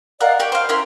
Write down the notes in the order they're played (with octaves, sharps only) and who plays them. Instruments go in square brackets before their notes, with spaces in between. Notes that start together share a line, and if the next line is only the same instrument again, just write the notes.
[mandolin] A#4 F#5 [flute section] D5 D#5 F5
[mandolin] G4 C#5 D5 [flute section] G5
[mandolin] C5 F5
[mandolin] C#4 E4 C6 [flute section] A#4